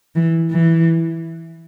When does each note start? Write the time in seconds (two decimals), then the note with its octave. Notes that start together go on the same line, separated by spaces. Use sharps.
0.15 E3
0.52 E3